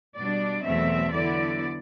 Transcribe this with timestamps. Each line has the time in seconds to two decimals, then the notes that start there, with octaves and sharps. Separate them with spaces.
0.17 B2 G3 D4 D5
0.65 E2 B2 F#3 A3 C4 E5
1.13 D3 F#3 B3 E4 D5